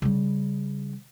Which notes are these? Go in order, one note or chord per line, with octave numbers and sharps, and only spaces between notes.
C#3 G3